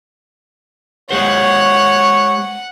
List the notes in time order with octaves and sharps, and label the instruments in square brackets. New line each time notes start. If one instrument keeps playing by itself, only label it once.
[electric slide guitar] G#3 G4 C5 [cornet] C#5 [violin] F#5